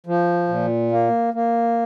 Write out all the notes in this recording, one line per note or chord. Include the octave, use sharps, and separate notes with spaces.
F3
A#2
A#3
A#3